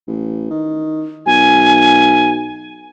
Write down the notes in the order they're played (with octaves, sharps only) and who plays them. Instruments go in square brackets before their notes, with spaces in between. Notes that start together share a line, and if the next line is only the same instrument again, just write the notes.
[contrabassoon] A1
D#3
[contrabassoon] B1 [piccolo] G#5